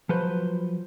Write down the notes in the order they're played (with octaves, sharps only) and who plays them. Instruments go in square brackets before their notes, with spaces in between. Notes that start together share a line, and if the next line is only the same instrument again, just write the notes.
[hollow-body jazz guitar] F3 F#3 B4 C5